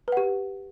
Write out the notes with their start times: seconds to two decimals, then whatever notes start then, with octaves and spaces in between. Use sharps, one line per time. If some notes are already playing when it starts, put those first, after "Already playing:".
0.08 B4
0.12 F#5
0.17 G4